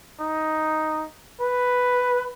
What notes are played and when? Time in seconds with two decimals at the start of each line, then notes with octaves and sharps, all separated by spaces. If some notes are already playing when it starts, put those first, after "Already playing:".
0.20 D#4
1.41 B4